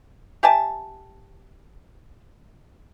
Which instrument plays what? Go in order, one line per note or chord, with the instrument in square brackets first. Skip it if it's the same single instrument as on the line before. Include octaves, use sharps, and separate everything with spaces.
[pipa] G4 E5 G#5 A5